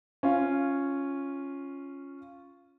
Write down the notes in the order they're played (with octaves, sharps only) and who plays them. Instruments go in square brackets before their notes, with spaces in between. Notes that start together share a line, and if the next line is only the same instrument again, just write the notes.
[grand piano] C#4 F4